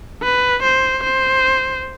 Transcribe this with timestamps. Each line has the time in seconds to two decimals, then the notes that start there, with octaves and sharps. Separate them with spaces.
0.23 B4
0.63 C5
1.04 C5